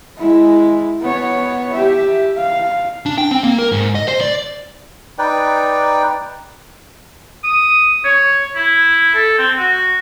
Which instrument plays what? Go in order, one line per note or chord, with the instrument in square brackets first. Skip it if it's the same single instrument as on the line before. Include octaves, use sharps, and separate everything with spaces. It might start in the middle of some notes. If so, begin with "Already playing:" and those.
[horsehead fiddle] G#3 E4
B3 C#5
G4 E5
F5
[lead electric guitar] D4
G5
C4
A#3
A#4
G#2
D#5
C5
D5
[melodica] D#4 B4 D5 G5
[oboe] D#6
C#5
E4
A4
C4
F#4